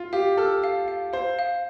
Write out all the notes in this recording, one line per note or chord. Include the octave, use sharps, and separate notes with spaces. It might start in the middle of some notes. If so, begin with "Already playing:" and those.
Already playing: F4
G4 F5
A4 F6
F5
F5
C5 F5
F5